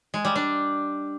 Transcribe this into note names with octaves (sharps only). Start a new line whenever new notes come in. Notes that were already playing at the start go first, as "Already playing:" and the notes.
G#3
G3
D4